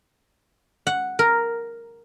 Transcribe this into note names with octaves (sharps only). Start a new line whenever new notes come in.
F#5
A#4